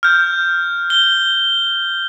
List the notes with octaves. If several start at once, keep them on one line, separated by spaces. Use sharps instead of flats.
F6 G6
G7